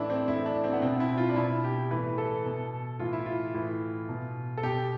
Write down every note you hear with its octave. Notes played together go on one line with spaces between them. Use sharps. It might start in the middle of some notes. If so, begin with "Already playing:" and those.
Already playing: A2 E3 D4 E4
C4
A2 E3 E4
D4
C4
B3
B2 C4
E4
F4
D4
B2 E4
G4
A2 E3 B4
A4
B2
A2 E3 F4
E4
F4
A2 E3
B2
A4
B2 G4